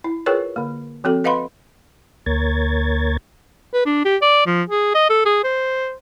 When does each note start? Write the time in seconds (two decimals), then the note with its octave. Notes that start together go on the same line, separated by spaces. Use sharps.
0.04 E4
0.26 F4 G#4 A#4 B4 C#5 G5
0.56 D3 A#3
1.04 F3 C4 F#4 A4
1.24 B4 D#5 F5 F#5 B5 C6
2.26 D2 A#3 A#4 C#5 G#6 A6
3.74 B4
3.86 D4
4.05 G4
4.22 D5
4.46 F3
4.69 G#4
4.95 D#5
5.10 A4
5.25 G#4
5.44 C5